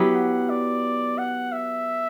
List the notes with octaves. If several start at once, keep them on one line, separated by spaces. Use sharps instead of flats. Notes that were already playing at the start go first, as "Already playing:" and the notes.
Already playing: F#3 B3 E4 G4
F#5
D5
F#5
E5